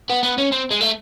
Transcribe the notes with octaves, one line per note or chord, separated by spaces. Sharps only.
B3
B3
C#4
C4
G#3
A3